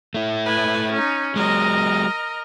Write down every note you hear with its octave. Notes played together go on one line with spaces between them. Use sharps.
A3 E4
B4 G#5
C#4 D#4
F#3 G#3 A#4 D#5